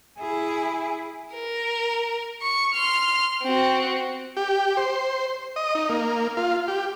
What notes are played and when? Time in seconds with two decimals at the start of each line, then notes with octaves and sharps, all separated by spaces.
0.19 E4 G#4
1.34 A#4
2.42 C#6
2.74 C6 F6
3.43 C4 F#4
4.37 G4
4.77 C5
5.56 D#5
5.75 D#4
5.89 A#3
6.37 F4
6.68 G4